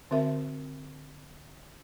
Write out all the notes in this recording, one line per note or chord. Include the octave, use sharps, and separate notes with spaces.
D3 C4 F#4 A#4 E5